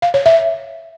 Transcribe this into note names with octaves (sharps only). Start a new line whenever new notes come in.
F5
C#5
E5